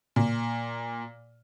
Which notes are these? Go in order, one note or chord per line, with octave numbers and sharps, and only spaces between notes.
A#2